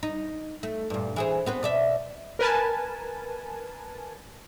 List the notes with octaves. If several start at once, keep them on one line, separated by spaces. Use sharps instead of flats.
D#4
A3
G2 A#2
E3 G#4 C5
B3 C4 B4
B2 D5 E5
A#4 B4 G#5 A5